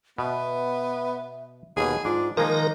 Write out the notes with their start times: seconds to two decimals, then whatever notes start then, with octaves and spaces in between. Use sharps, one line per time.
0.18 B2 B3 E5
1.77 D#2 B2 G#4
2.05 G#2 D4 F4
2.37 D#3 F3 G#3 A#3 D#4 A#4